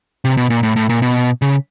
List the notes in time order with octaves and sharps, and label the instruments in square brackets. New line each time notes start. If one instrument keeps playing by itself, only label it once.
[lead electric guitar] C3
B2
A#2
A2
A2
A#2
B2
C#3